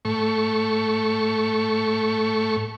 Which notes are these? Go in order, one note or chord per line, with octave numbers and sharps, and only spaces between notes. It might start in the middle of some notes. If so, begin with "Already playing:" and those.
A2 A3 C#6